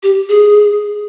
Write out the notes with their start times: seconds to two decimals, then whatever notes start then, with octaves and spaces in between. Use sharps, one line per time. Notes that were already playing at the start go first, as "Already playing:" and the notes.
0.03 G4
0.29 G#4